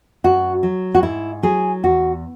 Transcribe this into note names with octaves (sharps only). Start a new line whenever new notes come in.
F#2 F#4
F#3
F#4
G#2 E4
F#3 G#4
E2 F#4